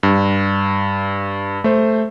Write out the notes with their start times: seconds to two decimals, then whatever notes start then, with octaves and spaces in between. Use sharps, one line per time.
0.03 G2
1.64 A3 C5